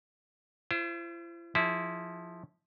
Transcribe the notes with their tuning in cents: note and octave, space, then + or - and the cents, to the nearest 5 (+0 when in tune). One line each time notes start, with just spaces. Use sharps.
E4 +45 C5 +0
F3 +0 E4 -20 G#4 +0